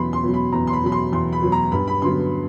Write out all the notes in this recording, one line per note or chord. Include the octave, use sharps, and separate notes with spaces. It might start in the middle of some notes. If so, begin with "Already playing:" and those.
Already playing: E2 B2 F#3 B5 C6
C6
B2 F#3
B5
E2 A#5
C6
B5
B2 F#3 B5
C6
E2 C6
B5
B2 F#3
A#5
G2 B5
B5
D3 F#3 B3 C6